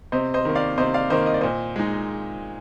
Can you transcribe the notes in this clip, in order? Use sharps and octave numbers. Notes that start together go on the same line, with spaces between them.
C3 C5 D#5
C5 D#5
D#3 A#3
D5 F5
C3 C5 D#5
D5 F5
D#3 A#3 C5 D#5
D#5
D5
A#2 C5 D#5
G#3 D#4